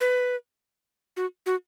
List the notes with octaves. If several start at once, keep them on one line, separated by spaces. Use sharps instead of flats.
B4
F#4
F#4